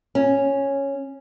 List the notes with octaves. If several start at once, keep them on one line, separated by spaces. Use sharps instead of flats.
C#4